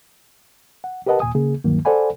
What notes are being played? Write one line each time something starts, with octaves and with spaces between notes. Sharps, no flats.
F#5
G4 A#4 B4 D#5 F#5 A5
D#2 A#2 G#5 D#6
C#3 A#3 G#4
D2 G2 D#3 F#3 A#3
A4 C5 D5 F#5 G#5 B5